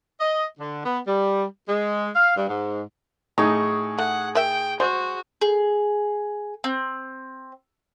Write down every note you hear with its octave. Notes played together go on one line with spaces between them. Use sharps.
D#5
D3
B3
G3
G#3
F5
G2
G#2
A2 D#4 G#4 A#5 C#6
A3 F#5
A#4 D#5 E5 G5
G#3 F#4 C5
G#4
C4